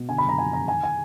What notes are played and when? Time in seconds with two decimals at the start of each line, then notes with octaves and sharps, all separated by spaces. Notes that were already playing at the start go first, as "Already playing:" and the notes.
Already playing: B2
0.09 D3 G#5
0.18 B5
0.24 F#1 A#5
0.38 F3 G#5
0.53 F2 A#5
0.68 D#3 G#5
0.83 G#5